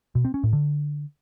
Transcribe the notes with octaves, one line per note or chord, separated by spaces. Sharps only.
B2
C4
C#4
A2
D3